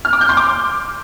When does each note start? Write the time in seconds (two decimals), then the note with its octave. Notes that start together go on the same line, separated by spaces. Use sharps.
0.05 F6
0.13 D6
0.21 G6
0.29 C6
0.37 D6